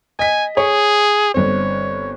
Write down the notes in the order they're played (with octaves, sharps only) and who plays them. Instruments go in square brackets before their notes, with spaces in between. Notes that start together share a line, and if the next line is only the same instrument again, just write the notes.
[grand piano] D#5 B6 [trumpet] G#5
[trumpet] G#4 [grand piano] C#5
[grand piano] G1 C4 [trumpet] C#5